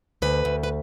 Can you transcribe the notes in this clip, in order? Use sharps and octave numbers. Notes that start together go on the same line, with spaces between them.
D2 B4
D2
B4